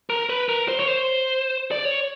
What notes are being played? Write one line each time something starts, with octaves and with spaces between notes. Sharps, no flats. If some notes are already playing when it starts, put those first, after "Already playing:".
A#4
B4
A#4
C5
C#5
C5
D5
C#5